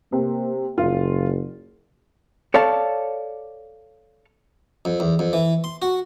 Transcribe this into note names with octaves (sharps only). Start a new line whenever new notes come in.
C3 A#3
F#1 F4
A4 C#5 D5 F5 A5
F2
E2
F2
E3
C6
F#4